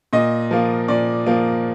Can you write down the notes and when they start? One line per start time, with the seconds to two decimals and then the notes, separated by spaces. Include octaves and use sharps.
0.13 A#2 D#5
0.51 F3 A#3
0.88 A#2 D5
1.26 F3 A#3